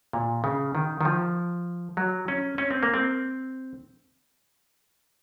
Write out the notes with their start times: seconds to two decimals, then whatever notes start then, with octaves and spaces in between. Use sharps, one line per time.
0.13 A#2
0.44 C#3
0.75 D#3
1.01 D#3
1.05 F3
1.97 F#3
2.28 C#4
2.58 C#4
2.71 C4
2.83 A#3
2.94 C4